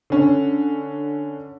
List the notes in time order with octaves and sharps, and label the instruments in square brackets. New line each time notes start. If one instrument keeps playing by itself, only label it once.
[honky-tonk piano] D3 C#4